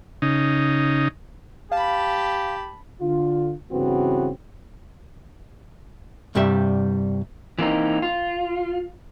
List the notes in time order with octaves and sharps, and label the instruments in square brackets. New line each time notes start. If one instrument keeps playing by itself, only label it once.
[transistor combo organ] C#3 D#4
[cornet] G4 [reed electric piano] F5 [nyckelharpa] A5 B5
[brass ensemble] D3 F4
G2 C#3 E3 B3 C4 F#4
[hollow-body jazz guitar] C2 G2 C3 G3 G4 E5
[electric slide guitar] E3 A#3 C4 D#4
F4